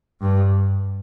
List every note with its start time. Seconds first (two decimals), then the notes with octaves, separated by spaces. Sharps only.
0.21 G2